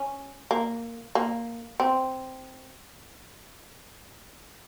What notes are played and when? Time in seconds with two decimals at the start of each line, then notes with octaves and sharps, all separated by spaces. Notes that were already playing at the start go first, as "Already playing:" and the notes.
Already playing: C#4
0.51 A#3
1.15 A#3
1.80 C4